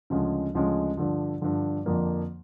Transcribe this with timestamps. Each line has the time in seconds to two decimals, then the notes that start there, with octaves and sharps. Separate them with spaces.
0.10 D2 C#3 F3 G#3 C#4
0.55 D2 C#3 F3 G#3 C#4
0.97 G2 D3 F3
1.41 G2 D3 F3
1.86 F2 D3 F3 A#3 D4